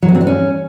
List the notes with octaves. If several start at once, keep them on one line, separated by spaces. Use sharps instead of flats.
F#3
B3
C4
D4
C#4